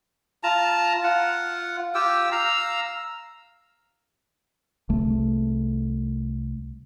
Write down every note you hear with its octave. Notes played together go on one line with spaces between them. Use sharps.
F4 A5 A#5
F4 F#5
F4 G4 G5 E6
F5 A#5 E6
C2 A3